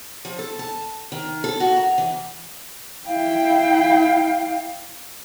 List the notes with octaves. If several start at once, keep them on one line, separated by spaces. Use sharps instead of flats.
F3
A4
A5
D#3
A4
F#4
A#4
E3
E4 F5 G5